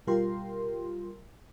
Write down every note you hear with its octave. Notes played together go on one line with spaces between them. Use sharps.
B2 G3 F4 G4 A#4 C6